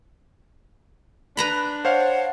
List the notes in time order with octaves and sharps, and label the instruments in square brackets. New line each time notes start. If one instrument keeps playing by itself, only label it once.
[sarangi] D4 [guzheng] B4 A#5 B5
[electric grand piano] C5 C#5 F5 [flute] F#5